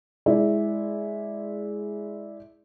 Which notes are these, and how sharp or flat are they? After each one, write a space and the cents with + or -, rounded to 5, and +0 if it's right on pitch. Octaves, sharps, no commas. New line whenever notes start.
G#3 +5 E4 -10 D5 +0